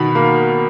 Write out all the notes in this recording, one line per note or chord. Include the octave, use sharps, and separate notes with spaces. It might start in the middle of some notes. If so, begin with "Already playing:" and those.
Already playing: B2 D#3 B5
A#3